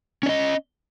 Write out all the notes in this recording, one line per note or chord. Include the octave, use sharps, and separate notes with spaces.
C#4 D5 D#5